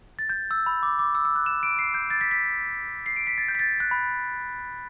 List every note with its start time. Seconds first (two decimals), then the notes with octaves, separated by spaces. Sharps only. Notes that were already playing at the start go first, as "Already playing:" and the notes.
0.19 A6
0.29 G6
0.51 E6
0.66 B5
0.83 D6
0.99 D6
1.15 E6
1.25 E6
1.36 F#6
1.46 E7
1.63 D7
1.79 C7
1.94 G6
2.10 A6
2.21 B6
2.31 B6
3.06 C7
3.16 D7
3.27 B6
3.38 A6
3.48 G6
3.55 B6
3.59 A6
3.80 F#6
3.91 B5